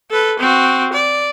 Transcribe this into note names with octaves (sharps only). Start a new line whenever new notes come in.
A4 B4
C4 F#4
D5